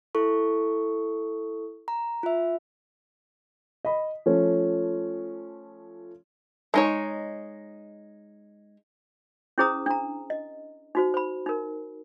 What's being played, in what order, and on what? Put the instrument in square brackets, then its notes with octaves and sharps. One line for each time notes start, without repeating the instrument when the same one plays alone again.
[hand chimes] E4 A4 C#6
A#5
F4 E5
[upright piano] D#5 B5
F3 A3 C#4
[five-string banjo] G#3 D#4 C#5
[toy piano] C#4 E4 G#4 C5 A#5 D#6
D4 A#5
D#5
D#4 F#4 C5
C5 B5
D#4 A#4